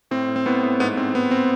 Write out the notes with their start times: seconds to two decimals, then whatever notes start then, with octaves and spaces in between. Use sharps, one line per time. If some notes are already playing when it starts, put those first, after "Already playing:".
0.11 A2 C4
0.28 A2
0.36 C4
0.46 A2 B3
0.63 A2
0.80 G#2 B3
0.97 G#2 C4
1.14 G#2 B3
1.31 C4